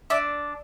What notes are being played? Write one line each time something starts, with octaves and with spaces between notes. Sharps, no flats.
D4 E5